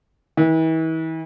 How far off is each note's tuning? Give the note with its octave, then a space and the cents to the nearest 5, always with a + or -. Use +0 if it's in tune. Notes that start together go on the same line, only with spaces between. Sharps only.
E3 -40